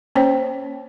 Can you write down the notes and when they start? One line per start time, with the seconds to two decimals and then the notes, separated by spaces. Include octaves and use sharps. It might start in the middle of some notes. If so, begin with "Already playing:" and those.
0.16 A#3 C#4 C5 C#5 G5